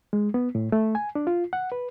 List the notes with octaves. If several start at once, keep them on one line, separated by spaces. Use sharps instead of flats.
G#3
B3
A2
A3
G#5
D4
F4
F#5
B4